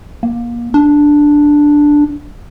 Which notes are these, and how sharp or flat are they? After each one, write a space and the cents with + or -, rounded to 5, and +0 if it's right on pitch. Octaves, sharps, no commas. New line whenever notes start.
A#3 +25
D4 +0